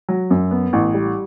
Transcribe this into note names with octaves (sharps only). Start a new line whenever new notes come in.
F#3
F#2
B3
A1
G3